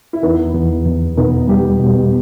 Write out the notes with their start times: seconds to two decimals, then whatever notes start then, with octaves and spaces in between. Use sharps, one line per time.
0.13 E4
0.23 E2 B3 D#4
0.55 E2
0.86 E2
1.17 B2 B3 D#4
1.48 G3 D#4 G4
1.80 B2